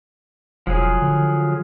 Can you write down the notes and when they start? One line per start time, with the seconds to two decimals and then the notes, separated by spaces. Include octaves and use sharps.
0.67 E1 F3 F#3 G#4
1.02 D3